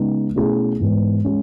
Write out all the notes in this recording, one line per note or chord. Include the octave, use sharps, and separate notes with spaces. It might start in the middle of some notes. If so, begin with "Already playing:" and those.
Already playing: C#3 G#3 B3 D#4
B2 A3 C#4 E4 G#4
G#2 E3 G#3 B3
G#3 C#4